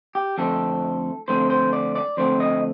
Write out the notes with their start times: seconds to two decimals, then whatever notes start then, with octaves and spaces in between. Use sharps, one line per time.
0.15 G4
0.38 F2 D3 A3 C4 A4
1.28 F2 D3 A3 C4 C5
1.50 C5
1.73 D5
1.95 D5
2.17 F2 D3 A3 C4 C5
2.40 D#5